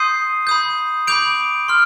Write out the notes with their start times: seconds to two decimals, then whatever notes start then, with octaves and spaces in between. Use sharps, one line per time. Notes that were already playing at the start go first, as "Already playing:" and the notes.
Already playing: C6 D#6 G6 C7 D#7
0.47 B5 D#6 G6
1.07 B5 D6 G6 D7 F7
1.68 C6 F6